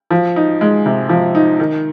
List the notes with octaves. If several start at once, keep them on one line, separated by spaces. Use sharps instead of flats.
F3
D#4
G#3
C3
F3
D#4
D#3